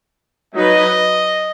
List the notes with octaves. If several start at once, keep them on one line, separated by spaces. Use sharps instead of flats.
F#3 D#4 B4 D#5